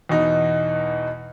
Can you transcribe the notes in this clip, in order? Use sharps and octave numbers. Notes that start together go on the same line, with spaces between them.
E2 B2 D#4